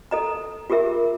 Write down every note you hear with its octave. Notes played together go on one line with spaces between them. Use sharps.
A4 D#5 A#5
F4 G4 G#4 A#4 E5